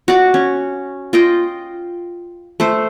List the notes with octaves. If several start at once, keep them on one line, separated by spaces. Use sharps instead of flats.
F#4 D5
C#4
F4 D#5 G5
A3 C5